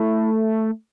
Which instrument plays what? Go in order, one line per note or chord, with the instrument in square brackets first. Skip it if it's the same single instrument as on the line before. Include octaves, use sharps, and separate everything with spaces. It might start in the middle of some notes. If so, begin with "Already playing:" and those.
Already playing: [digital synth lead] A3 [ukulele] E4